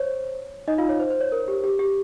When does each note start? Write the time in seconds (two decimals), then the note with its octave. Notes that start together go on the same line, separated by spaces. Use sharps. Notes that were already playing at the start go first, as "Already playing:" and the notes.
Already playing: C5 C#5
0.68 D#4 D#5
0.78 F4 F5
0.89 C#5
1.00 C5
1.10 C5
1.21 C#5
1.32 A#4
1.48 G4
1.64 G4
1.79 G4